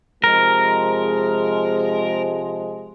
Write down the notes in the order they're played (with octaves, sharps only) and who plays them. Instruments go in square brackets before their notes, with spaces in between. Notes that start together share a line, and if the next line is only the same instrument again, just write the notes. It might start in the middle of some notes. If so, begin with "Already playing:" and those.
[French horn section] C3 F3 G#3 [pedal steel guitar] A#4